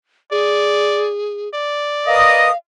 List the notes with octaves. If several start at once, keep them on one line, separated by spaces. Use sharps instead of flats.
G#4 D5
D5
A#4 B4 D#5 F5 D#6